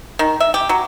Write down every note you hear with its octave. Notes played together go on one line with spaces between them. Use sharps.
D#3
E5
G4
F#3